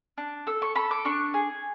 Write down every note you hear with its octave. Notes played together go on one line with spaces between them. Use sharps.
D4
A4 E6
C#6
A4 B5
D6
D4 C#6
G#4